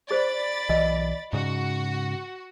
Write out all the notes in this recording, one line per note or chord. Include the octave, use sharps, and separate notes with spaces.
G#4 C5 D5 B5 A6
B1 E3 D#5
G#2 C#3 F#4